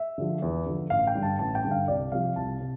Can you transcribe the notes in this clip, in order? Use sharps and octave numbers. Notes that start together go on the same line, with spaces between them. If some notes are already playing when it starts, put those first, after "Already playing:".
Already playing: E5
D3 F3
E2
D3 F3
A1 F5
G5
G2 D3
A5
A1 A5
G5
G2 D3
F5
C2 D5
C3 F3 F5
C2 A5
C3